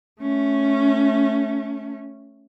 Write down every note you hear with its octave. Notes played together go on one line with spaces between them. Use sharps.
A3 C#4